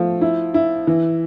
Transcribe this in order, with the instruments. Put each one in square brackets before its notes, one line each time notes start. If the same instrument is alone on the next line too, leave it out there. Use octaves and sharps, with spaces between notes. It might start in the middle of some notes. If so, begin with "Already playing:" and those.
Already playing: [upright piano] F3 A3
E4
E4
E3